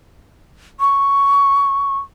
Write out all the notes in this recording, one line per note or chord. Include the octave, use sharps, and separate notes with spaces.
C#6